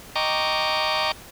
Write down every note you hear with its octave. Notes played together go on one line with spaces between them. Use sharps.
D#5 G5 A#5 C#6 D6